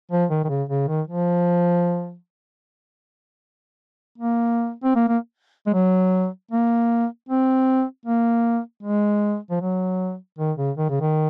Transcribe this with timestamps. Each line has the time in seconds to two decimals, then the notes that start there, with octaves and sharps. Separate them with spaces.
0.11 F3
0.30 D#3
0.44 D#3
0.49 C#3
0.69 C#3
0.88 D#3
1.07 F3
4.18 A#3
4.84 C4
4.96 A#3
5.09 A#3
5.67 G#3
5.73 F#3
6.51 A#3
7.29 C4
8.06 A#3
8.83 G#3
9.50 F3
9.61 F#3
10.38 D#3
10.57 C#3
10.77 D#3
10.90 C#3
11.01 D#3